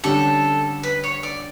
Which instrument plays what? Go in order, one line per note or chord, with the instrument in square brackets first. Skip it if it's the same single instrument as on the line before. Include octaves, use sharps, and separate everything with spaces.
[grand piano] D3 G3 C#4 G4 [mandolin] A4
[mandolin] B4
C#5
D5